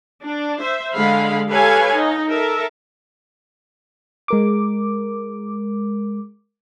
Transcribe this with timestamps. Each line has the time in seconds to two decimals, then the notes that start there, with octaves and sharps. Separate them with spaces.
0.23 D4
0.61 C5 E5
0.95 D3 G#3 F5 B5
1.49 G4 A4 B4 C#5 F5 G#5
1.93 D#4
2.29 A4 A#4 E5
4.28 G#3 A#4 D6